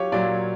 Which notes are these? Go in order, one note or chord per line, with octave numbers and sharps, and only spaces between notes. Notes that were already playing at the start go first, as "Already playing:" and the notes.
Already playing: F#3 F4 G4 C#5
A#2 F#3 D5